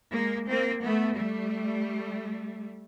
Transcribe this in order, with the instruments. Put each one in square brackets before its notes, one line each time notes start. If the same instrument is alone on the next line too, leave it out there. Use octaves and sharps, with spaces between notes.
[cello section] G#3 A#3
A#3 C4
A3 B3
G3 A3